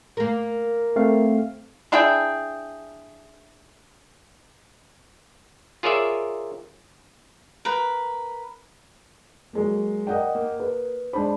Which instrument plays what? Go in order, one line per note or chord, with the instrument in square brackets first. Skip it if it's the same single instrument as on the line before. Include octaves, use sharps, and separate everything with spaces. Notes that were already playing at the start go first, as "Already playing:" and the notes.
[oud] A#3 A#4
[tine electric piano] A3 C4 F5
[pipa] D4 E4 G#4 G5
[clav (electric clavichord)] F4 G#4 A#4 C#5 D5 E5
[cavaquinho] A#4 B4
[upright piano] F#3 G#3 A#3
[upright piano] A#4 D5 [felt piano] D#5 F#5 G5
[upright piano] A#3
[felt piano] B4
[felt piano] G#3 D4 C5 [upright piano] B5